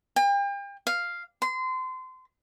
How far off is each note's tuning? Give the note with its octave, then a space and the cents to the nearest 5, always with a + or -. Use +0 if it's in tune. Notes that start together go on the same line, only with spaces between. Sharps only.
G5 +40
F5 +0
C6 -25